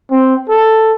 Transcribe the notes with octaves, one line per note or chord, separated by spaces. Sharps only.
C4
A4